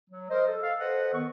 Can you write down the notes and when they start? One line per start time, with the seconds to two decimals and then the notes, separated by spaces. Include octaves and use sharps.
0.10 F#3
0.30 A#4 C5 D#5
0.47 A4
0.62 A4 F5
0.79 A4 B4 C5 D#5 F#5
1.12 D#3 B3 C#6